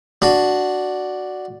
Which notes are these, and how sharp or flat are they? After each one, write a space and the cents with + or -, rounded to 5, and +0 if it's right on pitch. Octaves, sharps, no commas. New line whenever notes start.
D4 +0 F#4 +0